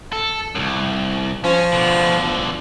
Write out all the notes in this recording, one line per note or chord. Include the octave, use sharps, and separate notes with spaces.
A4
C2 F#2
F3 C#4
B2 D3